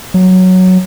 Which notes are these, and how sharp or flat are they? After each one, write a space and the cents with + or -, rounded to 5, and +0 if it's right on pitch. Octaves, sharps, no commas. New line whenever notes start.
F#3 +0